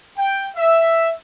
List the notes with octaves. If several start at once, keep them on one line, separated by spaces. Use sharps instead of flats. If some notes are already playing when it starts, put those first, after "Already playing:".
G5
E5